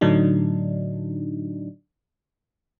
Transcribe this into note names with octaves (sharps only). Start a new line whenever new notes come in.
A2 D3 F#3 D4 D#4